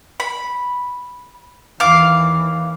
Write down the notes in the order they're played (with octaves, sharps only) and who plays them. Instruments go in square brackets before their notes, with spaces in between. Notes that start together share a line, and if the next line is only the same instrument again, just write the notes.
[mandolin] B5
[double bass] D#2 E3 [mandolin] F5 D6